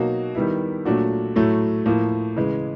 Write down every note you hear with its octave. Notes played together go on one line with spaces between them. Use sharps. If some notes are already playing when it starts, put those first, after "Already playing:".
Already playing: B2 F#3 A#3 D#4 F#4
D#3 G3 B3 E4
A#2 F#3 A3 D4 F#4
A2 F#3 A3
A2 F3 A#3
C#3 E3 G#3